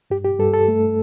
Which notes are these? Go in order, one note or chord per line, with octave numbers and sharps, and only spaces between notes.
G2 G4
G4
G2 A4
A4
A3